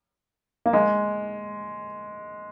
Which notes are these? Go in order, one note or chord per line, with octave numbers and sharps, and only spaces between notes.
A#3
G#3